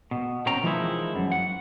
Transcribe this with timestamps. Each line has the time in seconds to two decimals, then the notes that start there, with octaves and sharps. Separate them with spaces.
0.11 B2
0.46 B2 C4 C#4 G5 A#5
0.63 E3 F3 G#3 A#3 D#4 E4
1.16 F#2
1.32 F#5